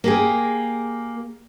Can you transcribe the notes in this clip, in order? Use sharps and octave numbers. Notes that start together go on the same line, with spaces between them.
A#3 G4 G#4